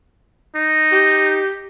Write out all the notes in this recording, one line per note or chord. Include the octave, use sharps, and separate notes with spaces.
D#4
G4